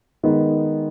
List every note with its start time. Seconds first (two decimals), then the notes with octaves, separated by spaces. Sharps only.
0.23 D#3 G#3 B3 D#4